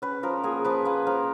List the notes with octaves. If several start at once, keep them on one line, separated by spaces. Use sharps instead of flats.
C#4 B4
F3 A#4
A#3 G#4
F3 B4
A#3 B4
F3 A#4